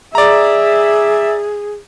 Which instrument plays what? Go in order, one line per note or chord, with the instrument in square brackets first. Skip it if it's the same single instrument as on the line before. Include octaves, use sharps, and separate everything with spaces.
[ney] G#4 [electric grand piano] D5 A#5 [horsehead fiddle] E5